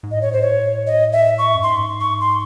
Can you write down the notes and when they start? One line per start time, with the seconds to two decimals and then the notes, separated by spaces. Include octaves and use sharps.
0.03 G#2
0.11 A2 D#5
0.22 C#5
0.33 C5
0.42 C#5
0.87 D#5
1.12 E5
1.38 C#6
1.55 F#2
1.63 G#2 C6
2.01 C#6
2.21 C6